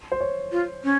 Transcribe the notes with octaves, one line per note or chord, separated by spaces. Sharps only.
C5
C#5
F4
C#4